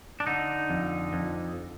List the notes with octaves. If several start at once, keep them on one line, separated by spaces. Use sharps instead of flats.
D4
D3 D#4
F2
F2